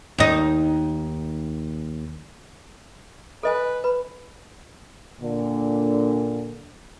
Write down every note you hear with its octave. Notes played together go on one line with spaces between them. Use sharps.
D#2 D#4
A4 B4 D#5 G#5
B4 B5
A#2 D3